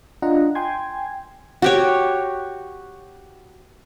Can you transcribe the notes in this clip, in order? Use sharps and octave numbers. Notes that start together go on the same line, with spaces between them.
D4 F4 D#5 F#5 A#5
G5 G#5 C6 G#6
F#4 G4 C#5